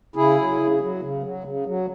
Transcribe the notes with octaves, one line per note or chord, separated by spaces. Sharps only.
C#3 E4 G#4
F#3
C#3
F#3
C#3
F#3
C#3
F#3